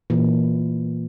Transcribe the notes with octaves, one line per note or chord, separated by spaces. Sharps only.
A#2 E3